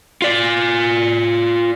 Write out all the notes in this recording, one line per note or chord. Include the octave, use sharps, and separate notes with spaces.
F4 D5